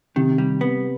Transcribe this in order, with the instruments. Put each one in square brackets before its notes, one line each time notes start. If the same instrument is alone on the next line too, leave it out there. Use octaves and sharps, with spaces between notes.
[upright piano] C3 [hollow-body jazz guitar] D#3
[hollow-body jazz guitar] G3
B3